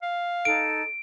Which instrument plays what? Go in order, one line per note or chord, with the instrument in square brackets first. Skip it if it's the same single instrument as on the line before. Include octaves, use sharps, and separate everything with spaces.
[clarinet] F5
[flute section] D#4 A4 [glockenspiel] D7